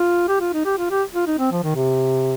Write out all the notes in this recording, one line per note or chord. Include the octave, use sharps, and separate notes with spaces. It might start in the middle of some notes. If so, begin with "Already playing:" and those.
Already playing: F4
G4
F4
D#4
G4
F4
G4
F4
D#4
C4
F3
D#3
C3